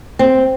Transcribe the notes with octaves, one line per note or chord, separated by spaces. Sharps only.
C4